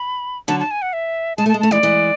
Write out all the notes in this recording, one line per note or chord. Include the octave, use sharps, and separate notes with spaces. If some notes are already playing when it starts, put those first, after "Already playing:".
Already playing: B5
D3 F#3 A5
A5
G#5
F#5
E5
G#3 A5
A3
A5
G#3
A3 A5
E3 G#3 D5
E3 G#3